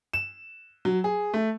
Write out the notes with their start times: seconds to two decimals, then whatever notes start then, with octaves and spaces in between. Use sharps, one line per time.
0.13 E7
0.85 F#3
1.04 G#4
1.34 A3